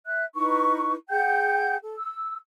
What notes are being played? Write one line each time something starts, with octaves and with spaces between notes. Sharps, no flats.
E5 F#6
D#4 E4 B4 C#6
G#4 F#5 G5 G6
A4
E6